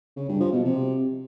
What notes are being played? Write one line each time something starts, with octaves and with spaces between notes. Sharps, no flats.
C#3
G2
F3
B2
C3